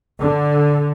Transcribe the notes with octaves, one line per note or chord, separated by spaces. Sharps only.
D3